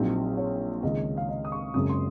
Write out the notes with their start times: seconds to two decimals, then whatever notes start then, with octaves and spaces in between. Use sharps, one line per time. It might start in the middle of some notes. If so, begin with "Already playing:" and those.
Already playing: A#1 A#2 F#3 C4 D#4
0.37 C#5
0.83 C#2 C3 D#3 G#3 D#5
1.17 F5
1.29 D#5
1.45 D#6
1.52 C#6
1.74 F#1 F#2 C#3 G#3 C4 D#6
1.89 C6